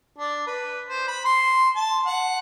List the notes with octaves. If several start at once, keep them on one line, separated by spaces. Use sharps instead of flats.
D4
B4
C5
B5
C6
A5
F#5